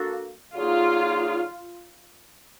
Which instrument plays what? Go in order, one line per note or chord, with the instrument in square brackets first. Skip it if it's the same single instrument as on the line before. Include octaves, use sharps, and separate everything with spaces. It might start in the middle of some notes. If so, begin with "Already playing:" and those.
Already playing: [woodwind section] A#3 D4 F#4 A4
[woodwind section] D3 F#3 A#3 D#4 G#4 [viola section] F4